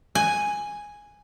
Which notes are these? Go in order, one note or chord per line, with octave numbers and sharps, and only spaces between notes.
G#5